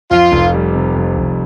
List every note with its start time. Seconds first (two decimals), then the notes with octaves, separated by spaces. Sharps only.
0.11 F2 F4
0.32 F1
0.54 G3
0.75 C3
0.96 F2
1.18 F1